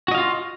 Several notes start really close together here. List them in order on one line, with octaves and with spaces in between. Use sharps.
F#4 D#5 F5 F4